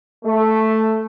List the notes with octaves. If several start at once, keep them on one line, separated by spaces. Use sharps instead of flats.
A3